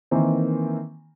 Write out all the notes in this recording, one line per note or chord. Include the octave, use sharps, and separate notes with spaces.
D#3 E3 A#3 C4